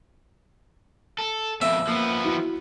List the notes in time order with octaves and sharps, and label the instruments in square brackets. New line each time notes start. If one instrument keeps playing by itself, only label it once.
[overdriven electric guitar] A4
[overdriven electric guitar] F2 B2 [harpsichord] E5
[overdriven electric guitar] F3 B3 [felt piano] A#3
[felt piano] E4 F#4